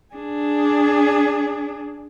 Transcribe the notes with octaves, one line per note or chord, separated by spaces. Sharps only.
D4 G#4